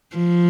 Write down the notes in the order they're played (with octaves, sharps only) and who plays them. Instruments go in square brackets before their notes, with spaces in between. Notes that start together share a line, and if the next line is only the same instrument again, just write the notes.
[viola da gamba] F3